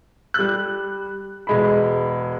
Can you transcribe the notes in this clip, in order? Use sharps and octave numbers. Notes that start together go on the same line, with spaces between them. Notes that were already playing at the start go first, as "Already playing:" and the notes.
G3 F#6
E1 G#3 B5